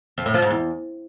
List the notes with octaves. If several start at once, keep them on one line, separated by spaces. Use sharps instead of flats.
F2
A2
F3
G#2
E2